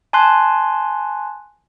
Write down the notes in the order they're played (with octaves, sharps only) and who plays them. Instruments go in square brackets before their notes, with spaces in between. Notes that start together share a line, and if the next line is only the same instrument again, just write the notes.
[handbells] G#5 A5 C6 F#6